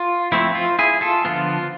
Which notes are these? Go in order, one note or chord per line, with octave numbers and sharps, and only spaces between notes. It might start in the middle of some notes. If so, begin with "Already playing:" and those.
Already playing: F4
F3 A3 C4 E4
F4
E4 G#4
F4 A4
D3 F3 B3 F4